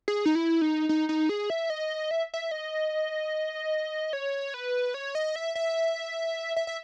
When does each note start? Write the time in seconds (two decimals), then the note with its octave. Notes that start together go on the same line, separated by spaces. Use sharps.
0.08 G#4
0.26 D#4
0.35 E4
0.62 D#4
0.89 D#4
1.09 D#4
1.29 G#4
1.50 E5
1.70 D#5
2.11 E5
2.34 E5
2.51 D#5
4.13 C#5
4.54 B4
4.94 C#5
5.15 D#5
5.36 E5
5.55 E5
6.56 E5
6.67 E5